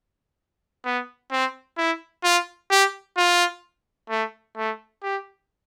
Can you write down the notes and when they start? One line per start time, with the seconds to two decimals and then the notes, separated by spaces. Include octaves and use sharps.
0.85 B3
1.31 C4
1.78 E4
2.24 F4
2.71 G4
3.17 F4
4.10 A3
4.57 A3
5.03 G4